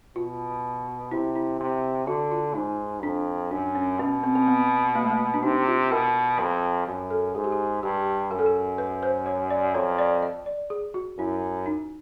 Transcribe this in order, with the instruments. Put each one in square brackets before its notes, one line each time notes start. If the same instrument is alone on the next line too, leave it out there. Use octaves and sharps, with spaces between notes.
[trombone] B2 [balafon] F4
[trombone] C3 [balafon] E4
[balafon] E4
[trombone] C3
[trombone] D3 [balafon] F#4
[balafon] F4
[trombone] G#2 [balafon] D#4
[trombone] F2 [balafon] D4
[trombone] F#2 [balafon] D4
[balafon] C#4
[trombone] B2 [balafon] C#4
[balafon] C4
C4
B3
A#3
A3
A#3
D4
[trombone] C3 [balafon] D#4
[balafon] F4
[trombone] B2 [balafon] A#4
[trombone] F2
F#2
[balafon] A4
[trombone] G#2 [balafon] G#4
[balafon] G4
G#4
[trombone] G2 [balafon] G4
[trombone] F#2 [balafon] A#4
[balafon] A4
A#4
B4
C5
C#5
D5
[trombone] F2 [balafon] C#5
[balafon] D5
D#5
D5
G#4
F#4
[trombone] F#2 [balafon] E4
[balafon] D#4